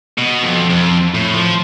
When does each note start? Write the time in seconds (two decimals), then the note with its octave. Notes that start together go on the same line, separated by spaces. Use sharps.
0.18 B2
0.43 F2
0.69 F2
1.15 A2
1.34 F3